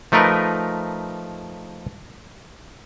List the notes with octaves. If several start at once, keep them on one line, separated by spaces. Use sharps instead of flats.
F3 A3 D#4 A#4 B4